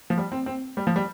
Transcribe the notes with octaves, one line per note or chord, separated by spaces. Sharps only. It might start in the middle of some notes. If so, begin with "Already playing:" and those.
F3
G3
C4
C4
G3
F3
G3